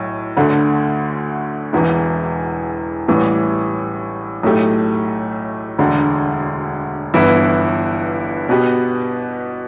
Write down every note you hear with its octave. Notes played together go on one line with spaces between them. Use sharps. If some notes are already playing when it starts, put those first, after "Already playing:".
Already playing: B1 A2
D2 D3 A3
E1 E2 E3
A1 A2 E3 G3
B1 A2 A3 G4
E1 D2 D3
G1 G2 E3 B3 E4
B2 B3 G4